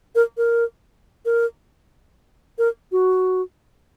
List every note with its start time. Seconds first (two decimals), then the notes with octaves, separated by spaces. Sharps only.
0.15 A#4
0.37 A#4
1.26 A#4
2.58 A#4
2.92 F#4